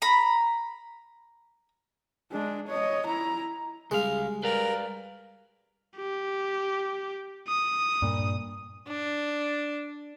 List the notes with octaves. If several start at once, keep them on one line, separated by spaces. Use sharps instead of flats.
A#5 B5
G#3 D4
C#5 D#5
E4 A#5
C#2 G3 G#3 F5
A#4 B4 D5 F5
G4
D#6
G2 A#2
D4